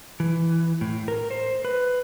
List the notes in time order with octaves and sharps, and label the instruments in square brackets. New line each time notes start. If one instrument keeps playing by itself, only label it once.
[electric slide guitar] E3
A2
A#4
C5
B4